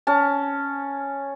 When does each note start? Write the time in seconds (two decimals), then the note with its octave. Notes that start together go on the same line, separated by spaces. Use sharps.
0.07 C#4 A5